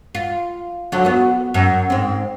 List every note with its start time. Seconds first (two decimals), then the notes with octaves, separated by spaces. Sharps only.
0.15 F4
0.92 D3 F#3
1.05 B3 F#4
1.54 F#2
1.90 G#2 C4